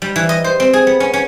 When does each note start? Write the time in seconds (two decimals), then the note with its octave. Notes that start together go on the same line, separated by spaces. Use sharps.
0.02 G3
0.16 E3
0.29 D#5
0.44 C5
0.60 C4
0.73 G#4
0.87 B3
1.00 C#4
1.14 C#4